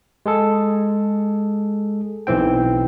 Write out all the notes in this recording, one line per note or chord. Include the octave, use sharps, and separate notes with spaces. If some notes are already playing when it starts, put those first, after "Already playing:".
G#3 G#4 A4
B1 E3 C4 G5